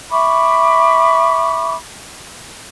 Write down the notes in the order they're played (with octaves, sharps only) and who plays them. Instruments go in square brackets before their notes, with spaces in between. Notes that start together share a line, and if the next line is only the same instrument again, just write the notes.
[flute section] E5 B5 C#6 D6